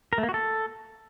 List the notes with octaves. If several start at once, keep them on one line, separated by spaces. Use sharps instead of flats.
A#4
A3
A#3
F#4
A4